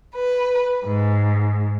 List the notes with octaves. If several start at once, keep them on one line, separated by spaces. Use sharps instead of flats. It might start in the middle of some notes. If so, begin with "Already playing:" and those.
B4
G#2